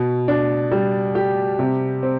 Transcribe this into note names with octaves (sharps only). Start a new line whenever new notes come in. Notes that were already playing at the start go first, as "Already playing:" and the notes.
Already playing: B2
D4
G3
G4
C3
C4